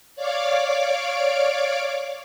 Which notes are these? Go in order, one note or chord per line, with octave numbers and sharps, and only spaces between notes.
C#5 D5 F5 D6